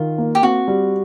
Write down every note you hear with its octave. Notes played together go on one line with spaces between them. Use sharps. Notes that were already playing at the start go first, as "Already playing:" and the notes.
Already playing: D#3 F4
A#3
G4
C4 F#4
G3